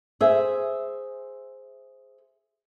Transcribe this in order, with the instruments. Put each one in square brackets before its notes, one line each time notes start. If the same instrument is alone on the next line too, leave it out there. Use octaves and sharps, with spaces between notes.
[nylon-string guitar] G#4 C5 E5